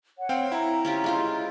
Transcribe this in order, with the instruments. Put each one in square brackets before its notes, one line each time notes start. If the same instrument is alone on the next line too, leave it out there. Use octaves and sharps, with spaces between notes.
[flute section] C#5 F#5
[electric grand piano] C4 F5 G5
[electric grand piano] E4 [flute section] A#5
[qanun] C#4 F4 G4
G#3 F4 C5